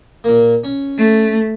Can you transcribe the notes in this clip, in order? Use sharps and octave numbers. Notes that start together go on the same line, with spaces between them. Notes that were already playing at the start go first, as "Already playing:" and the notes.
A#2 A#3
C#4
A3